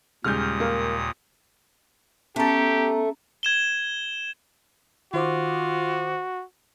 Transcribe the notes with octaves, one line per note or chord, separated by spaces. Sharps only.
D#2 A#2 C#3 G3 G#3 D#6 F6 G6
A#3
A3 B3 C#4 G4 A4 A#5 A6
G#6 E7 G7
D#3 F4 F#4 C5 D6